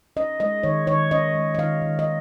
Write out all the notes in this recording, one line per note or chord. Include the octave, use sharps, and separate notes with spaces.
C#4 D#5
G#3 D#5
D#3 C#5
D#3 C#5
C#4 D#5
G#3
D#5
D#3 F5
D#3
D#5
A#3